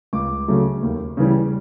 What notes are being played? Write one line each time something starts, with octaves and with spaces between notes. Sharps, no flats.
C#2 D6
C#3 F#3 A3
D#2
C#3 E3 G3